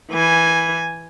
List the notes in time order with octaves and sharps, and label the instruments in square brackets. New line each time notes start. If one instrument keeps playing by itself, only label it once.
[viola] E3 G#5